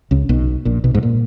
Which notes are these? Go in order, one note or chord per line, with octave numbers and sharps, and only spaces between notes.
C#2 C#3
B1 B2
A#1 A#2
B1 B2
G#2
A#2